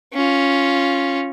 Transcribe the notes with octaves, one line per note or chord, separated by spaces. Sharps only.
C#4 F4